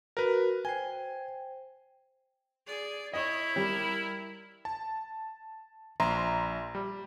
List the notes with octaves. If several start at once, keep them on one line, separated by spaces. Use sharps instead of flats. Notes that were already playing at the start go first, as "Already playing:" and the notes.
F#4 A#4 B4
C5 G5 G#5
G#4 D5
E4 C#5 D#5
G3 A#4
A5
A#1 E5 A#5 C6
G3